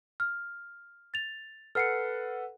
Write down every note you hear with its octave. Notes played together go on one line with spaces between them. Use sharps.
F6
A6 F7
A4 B4 F#5 F6 C7 C#7